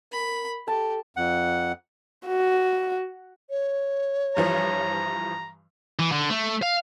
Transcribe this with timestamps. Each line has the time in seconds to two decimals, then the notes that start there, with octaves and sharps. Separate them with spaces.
0.12 A#4 B5
0.68 G4 A4 A5
1.17 F2 F#5
2.27 F#4
3.50 C#5
4.37 G2 E3 F3 A#5
5.99 E3
6.12 D3
6.30 A3
6.62 F5